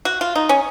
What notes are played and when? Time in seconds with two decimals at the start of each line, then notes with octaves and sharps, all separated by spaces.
0.05 F#4
0.21 F4
0.36 D#4
0.49 C#4